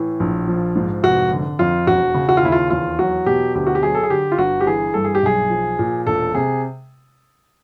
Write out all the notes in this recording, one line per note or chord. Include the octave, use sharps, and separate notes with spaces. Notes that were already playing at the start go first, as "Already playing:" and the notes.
Already playing: A2 E3
A#1
F3
G#2
F1 F#4
D3
F2 F4
E1 F#4
C#3
F#4
F4
D#2 E4
F4
E2 F4
F#3 F#4
B2 G4
D2 G4
F#4
G4
F#3 G#4
A4
G#4
D3 G4
F4
G1 F#4
G4
E3 G#4
G2 A4
G#4
G4
B1 G#4
F3
A#2
E1 A4
C3 G#4